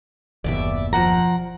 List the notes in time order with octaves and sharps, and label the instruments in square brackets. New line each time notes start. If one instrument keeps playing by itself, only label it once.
[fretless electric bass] F#1 D#2 B2 [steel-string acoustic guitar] D5 E5
[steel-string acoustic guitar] F3 F#5 A#5